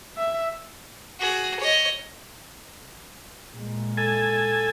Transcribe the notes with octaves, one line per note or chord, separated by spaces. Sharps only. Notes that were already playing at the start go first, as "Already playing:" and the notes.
E5
F#4 G#4
C#5 D#5
A#2 G#3
A4 G#5